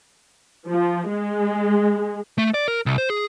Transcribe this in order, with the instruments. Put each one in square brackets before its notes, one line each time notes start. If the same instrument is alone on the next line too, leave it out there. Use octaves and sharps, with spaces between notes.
[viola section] F3
G#3
[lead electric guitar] A3
D5
A#4
C2
C5
G#4